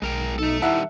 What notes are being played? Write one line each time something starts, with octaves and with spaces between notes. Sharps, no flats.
B1 G#3 A#4 G5
A3 D#4 A4
D#3 G3 E4 E5 F#5 A5